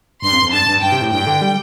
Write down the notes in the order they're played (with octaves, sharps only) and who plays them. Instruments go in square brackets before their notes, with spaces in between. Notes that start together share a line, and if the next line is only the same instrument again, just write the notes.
[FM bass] G2 [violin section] C6
[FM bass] F2
F2
[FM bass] G2 [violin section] A5
[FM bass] G2
[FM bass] G2 [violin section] G5
[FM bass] C3
A2
[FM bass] G2 [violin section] G5
[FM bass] D3
G3